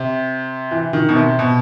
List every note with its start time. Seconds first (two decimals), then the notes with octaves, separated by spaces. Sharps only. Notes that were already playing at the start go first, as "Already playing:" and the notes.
Already playing: C3
0.71 E3
0.93 D#3
1.09 B2
1.16 C3
1.39 B2